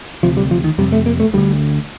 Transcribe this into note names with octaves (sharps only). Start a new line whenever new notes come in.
D2 C3 F3
G3
F3
D#3
F2 C3 G3
A3
A#3
A3
D2 D3 G3